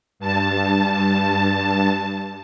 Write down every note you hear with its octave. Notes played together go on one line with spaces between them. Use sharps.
G2 A5